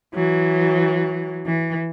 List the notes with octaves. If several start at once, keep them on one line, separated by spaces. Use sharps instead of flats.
E3 F#3
E3